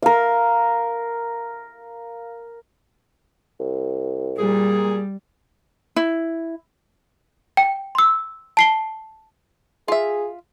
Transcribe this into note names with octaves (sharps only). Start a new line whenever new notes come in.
A#4 F5
C2
A#2 G3 G#4
E4
G5
C6 E6
A5 C7 G7
F4 G#4 E5